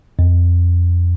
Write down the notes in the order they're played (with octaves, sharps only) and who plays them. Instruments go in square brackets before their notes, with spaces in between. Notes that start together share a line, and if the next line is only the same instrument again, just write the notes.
[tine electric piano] F2